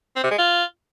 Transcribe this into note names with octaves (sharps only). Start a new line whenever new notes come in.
C4
C3
G#3
F4